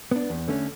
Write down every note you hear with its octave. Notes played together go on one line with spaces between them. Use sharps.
B3 D4
E2
D3 A3 C#4